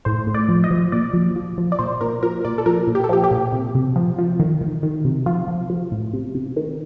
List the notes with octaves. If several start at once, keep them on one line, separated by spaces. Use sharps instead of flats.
A2 C5
A2
D5
F3
D#5
F3
A#2 D5
F3
F3
F3
D5
A#2 C5
A#2 A#4
F3 A#4
A#2 D5
A4
F3 A#4
A#2
G4
A4
F3 G4
G4
A#2
C3
C3
F3
F3
D#3
D#3
D#3
C3
F3 F4
F3
F3
A2
C3
C3
D#3